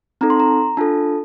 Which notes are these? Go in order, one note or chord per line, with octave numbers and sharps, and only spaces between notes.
C4 D#4 A4 A#5
C6
A#5
D4 F4 A4 A5